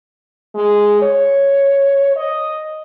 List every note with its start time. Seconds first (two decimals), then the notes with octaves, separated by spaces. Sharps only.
0.55 G#3
1.02 C#5
2.16 D#5